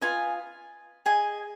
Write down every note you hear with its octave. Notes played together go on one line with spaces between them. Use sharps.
F4 B4 D#5 G#5
G#4 D#5 G#5